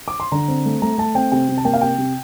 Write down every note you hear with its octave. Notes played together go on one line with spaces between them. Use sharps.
D6
C6
D3 A#5
C4
A3
A3 A#5
A3 A5
C4 G5
C3 G5
C3
A5
A#3 G5
F5
C3 G5
C3